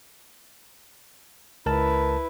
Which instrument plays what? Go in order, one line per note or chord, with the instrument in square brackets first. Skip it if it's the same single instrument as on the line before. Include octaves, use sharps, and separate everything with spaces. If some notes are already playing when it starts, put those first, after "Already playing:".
[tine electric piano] C#2 A#4 A5 [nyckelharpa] E4 B4